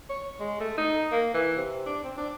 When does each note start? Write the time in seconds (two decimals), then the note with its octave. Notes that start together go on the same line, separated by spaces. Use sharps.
0.09 C#5
0.40 G#3
0.60 A3
0.77 D#4
1.12 A#3
1.34 E3
1.57 C3
1.86 D4
2.04 C4
2.17 D4